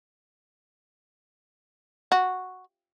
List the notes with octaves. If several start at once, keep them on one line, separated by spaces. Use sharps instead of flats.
F#4